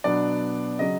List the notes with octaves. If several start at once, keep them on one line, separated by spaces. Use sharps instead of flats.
B2 F#3 B3 D4 D5
C#3 F#3 D#5